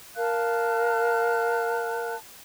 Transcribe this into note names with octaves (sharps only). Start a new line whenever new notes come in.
A#4 F5 A5 F#6